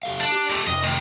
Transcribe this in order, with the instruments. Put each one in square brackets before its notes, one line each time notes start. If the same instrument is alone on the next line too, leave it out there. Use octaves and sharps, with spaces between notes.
[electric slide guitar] G4 A4 F5
[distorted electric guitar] D4
[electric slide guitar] G4
[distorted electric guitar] C#2 A3
[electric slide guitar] F2 C3 [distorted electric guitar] D#5
[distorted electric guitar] A2 D#3